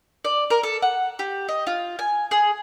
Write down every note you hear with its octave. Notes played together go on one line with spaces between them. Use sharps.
D5
A#4
A4
F#5
G4
D#5
F4
G#5
G#4